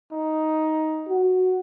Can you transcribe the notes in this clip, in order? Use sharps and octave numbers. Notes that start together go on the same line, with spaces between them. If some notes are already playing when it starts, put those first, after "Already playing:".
D#4
F#4